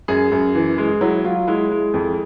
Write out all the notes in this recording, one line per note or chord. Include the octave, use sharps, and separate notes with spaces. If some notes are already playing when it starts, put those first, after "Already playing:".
F#2 G#4
F#2
E3
G#3
F#3 E4
F#3 F4
G#3 E4
G#3
F2